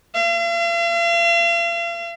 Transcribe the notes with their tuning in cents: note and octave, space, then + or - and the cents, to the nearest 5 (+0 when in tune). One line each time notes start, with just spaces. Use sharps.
F5 -45